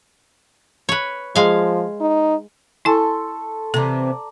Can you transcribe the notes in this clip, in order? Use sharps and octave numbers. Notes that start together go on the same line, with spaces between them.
B4 C#5
F3 G#3 F5
D#4
E4 A4 G#5 C6 C#6
C3 E3 A4 D5 A#5